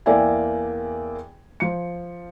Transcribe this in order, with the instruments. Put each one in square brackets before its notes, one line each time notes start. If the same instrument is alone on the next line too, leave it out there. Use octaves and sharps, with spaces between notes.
[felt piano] E2 A#3 D5 E5 G5 G#5
F3 C#7